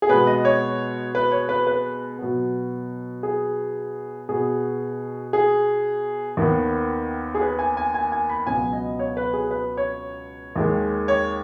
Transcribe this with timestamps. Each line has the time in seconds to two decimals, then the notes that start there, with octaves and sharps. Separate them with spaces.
0.02 G#4
0.09 B2 G#3 B3 B4
0.27 D#5
0.45 C#5
1.15 B4
1.32 C#5
1.49 B4
1.67 B4
2.19 B2 F#3 B3
3.23 G#4
4.29 B2 B3 G#4
5.33 G#4
6.37 D#2 D#3 B3
7.35 G#4
7.41 B4
7.59 G#5
7.77 G#5
7.94 G#5
8.12 G#5
8.29 B5
8.47 C#2 B2 F#3 B3 G#5
8.73 D#5
8.99 C#5
9.17 B4
9.33 G#4
9.51 B4
9.77 C#5
10.56 D#2 D#3 G#3
11.08 C#5